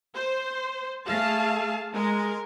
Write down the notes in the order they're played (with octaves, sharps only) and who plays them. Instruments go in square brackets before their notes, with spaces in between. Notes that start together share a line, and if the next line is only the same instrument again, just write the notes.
[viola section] C5
[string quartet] A3 [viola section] G#4 F5 A5
[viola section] G#3 [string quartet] A#4